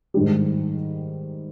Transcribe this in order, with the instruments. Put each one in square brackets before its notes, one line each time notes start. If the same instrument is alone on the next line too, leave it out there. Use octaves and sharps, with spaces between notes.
[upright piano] G#2 D#3 G3